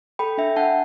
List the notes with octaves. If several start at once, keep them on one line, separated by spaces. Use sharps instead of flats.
A4 G5 B5
D4 E5 G5
D4 F#5 A5